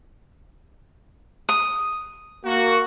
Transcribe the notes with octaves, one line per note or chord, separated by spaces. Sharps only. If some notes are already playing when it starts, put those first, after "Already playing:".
D#6
A#3 F#4